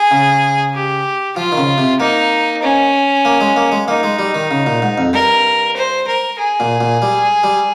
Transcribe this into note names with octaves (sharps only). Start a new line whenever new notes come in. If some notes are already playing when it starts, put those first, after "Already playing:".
Already playing: G#4
C#3
G4
F3 F4
D#3
C#3
C3
A#3 D#4
C#4
A#3
G#3
A#3
G#3
A#3 D#4
G#3
G3
D#3
C#3
A#2
G#2
F2
G2 A#4
C5
A#4
G#4
A#2
A#2
G3
G3